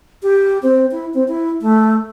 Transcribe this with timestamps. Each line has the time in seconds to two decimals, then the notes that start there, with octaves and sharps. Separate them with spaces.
0.23 G4
0.63 C4
0.91 E4
1.14 C4
1.28 E4
1.61 A3